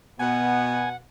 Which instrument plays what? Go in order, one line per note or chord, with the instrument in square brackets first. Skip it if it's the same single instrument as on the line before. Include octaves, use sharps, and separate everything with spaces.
[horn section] B2 [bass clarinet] B3 [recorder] F#5 [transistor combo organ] G#5